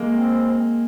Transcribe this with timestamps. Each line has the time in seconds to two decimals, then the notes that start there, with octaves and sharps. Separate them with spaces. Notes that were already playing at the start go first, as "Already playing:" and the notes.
Already playing: G#3 A#3
0.13 C4